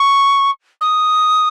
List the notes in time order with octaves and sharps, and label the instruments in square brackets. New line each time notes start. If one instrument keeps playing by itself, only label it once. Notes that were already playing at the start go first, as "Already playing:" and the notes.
Already playing: [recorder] C#6
D#6